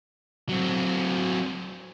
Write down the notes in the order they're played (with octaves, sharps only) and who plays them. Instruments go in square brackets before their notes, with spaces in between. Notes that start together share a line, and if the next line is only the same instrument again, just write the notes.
[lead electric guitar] F#3 C4